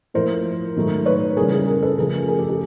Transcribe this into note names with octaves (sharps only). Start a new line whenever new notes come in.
A2 F3 A#3 A#4 C5
G#2 D#3 F#3 A3
B4 C#5
C#3 E3 G3 A#3 G#4 A#4
G#4 A#4
G#4 A#4
A4 B4
C#3 F3 A3 G#4 A#4
G#4 A#4
G4 A4
G4 A4